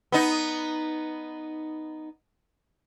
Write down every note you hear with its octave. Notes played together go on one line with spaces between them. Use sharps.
B3 D#4